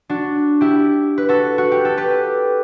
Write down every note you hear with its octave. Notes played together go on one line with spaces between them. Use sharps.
D4 F#4
E4 G4
B4
F#4 A4
F#4
G4
A4
G4 B4